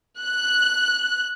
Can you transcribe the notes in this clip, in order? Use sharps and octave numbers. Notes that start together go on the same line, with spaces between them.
F#6